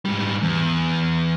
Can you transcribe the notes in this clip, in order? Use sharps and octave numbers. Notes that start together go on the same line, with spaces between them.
G#2 G3
E2